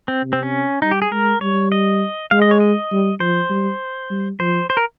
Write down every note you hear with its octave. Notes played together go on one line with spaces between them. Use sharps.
C4
C3
C4
C#4
G3 D#4
G4
G#4
G#3 A#4
G3 C#5
D#5
G#3 F5
D#5
C#5
D#5
G3
F3 C5
G3
G3
F3 C5
C5
A#4